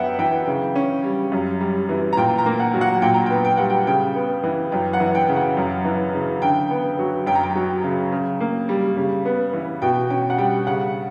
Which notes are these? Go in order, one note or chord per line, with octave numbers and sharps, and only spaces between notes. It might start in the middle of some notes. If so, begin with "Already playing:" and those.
Already playing: F#2 B3 E5 F#5 G5
E3 G5
C#3
C#4
G3
F#2
G3
E3
A#5
A#2 G5
A#5
A#3
F#5
F#3
F#5
A#2 G5
A#5
B3 G5
G5
G3 F#5
G5
C#3 G5
B3
E3
F#2 G5
F#5
E3
G5
C#3
F#5
F#2
E3
C#3
D3 G5
B3
F#3
F#2 G5
A#5
G5
F#3
C#3
C#3
A#3
G3
C#3
B3
E3
B2 G5
C#4 G5
F#5
G3 G5
C#3 F#5